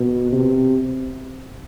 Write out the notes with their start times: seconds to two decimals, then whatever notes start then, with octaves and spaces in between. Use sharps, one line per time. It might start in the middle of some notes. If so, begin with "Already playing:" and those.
Already playing: B2
0.32 C3